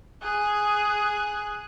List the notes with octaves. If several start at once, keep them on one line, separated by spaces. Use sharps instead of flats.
G#4 F#6